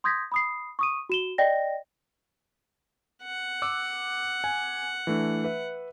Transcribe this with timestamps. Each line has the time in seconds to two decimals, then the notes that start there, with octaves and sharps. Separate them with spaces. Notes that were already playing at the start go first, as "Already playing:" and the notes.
0.04 C6 D#6 G6 G#6 A#6 B6
0.32 B5 D#6 C7
0.79 C#6 D#6 D#7
1.09 F#4 E7 G7
1.38 D5 D#5 G5 A#6
3.23 F#5
3.62 D6 E6 F#6
4.44 G#5
5.07 E3 A3 D4
5.44 B4 E5